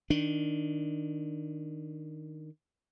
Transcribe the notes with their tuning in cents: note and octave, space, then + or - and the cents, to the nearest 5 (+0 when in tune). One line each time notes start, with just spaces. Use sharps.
D#3 +0 D4 +0